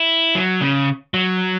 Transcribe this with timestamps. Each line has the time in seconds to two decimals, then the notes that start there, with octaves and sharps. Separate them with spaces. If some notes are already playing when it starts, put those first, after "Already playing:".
Already playing: E4
0.35 F#3
0.61 C#3
1.14 F#3